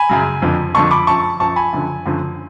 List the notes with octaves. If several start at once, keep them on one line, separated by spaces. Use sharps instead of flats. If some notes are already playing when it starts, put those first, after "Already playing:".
Already playing: G#5 B5
F#2 C#3 F#3
F2 D3 F3
F2 D3 F3 A5 C#6
B5 D6
F#2 F3 A5 C#6
F#2 F3 A5 C#6
G#5 B5
F#2 D3 F3
F#2 D3 F3